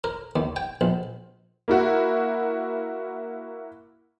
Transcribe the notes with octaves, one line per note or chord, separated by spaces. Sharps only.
A#4
D#2
G5
A#1
A#3 E4 F#4